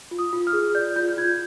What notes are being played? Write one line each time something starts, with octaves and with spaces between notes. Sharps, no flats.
F4
D#6
F4
F6
G#4
D5 G6
F4 G6
G6
F4 G#6